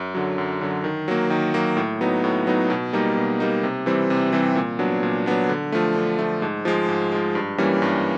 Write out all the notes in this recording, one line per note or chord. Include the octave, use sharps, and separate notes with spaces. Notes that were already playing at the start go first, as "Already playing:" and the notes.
Already playing: F#2
D3 F#3
F#2
D3 F#3
D#3
F#3 A#3
D#3
F#3 A#3
A2
F#3 B3 D#4
A2
F#3 B3 D#4
B2
G3 A#3 D#4
B2
G3 A#3 D#4
C3
E3 G3 C4
C3
E3 G3 C4
A#2
F#3 B3 D4
A#2
F#3 B3 D4
D3
F3 A3
D3
F3 A3
G#2
F3 G#3
G#2
F3 G#3
G2
E3 G3 A#3 C#4
G2